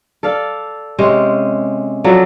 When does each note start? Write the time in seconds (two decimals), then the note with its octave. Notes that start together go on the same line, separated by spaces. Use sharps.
0.23 A4 D5 F5
0.99 C3 G#3 C#4 C5
2.04 F3 F#3 A4 D5